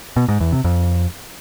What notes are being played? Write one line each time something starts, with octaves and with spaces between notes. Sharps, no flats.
B2
G#2
E2
C3
F2